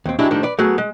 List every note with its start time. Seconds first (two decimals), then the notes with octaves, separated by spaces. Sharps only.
0.06 D#2 C4
0.19 F#3 G#3 D4 E4 G4
0.31 A2 D#3 F3 G3 D4
0.43 B4 D5
0.59 F#3 A3 B3 F#4 G#4
0.78 G#3